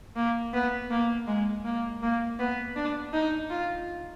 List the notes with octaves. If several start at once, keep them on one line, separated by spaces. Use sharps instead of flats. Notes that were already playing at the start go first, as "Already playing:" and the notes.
A#3
B3
A#3
G#3
A#3
A#3
B3
D4
D#4
F4